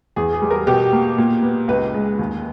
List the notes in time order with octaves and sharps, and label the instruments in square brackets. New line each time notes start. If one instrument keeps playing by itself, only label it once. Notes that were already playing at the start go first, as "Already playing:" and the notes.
[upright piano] E2 G#4
G#4
G3
A#4
B2 G4
A#3
A#2
B3
C#2 B4
G#3
D#2